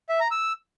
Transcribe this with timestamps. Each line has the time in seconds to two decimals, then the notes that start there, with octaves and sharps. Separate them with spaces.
0.09 E5
0.20 A#5
0.31 E6